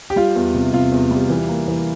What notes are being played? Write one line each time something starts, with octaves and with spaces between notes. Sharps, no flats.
G4
G3 F4
E2
C3
C3 F4
E2
G3
E3
A#3
E3